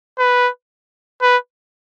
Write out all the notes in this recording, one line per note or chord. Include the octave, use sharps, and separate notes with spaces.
B4
B4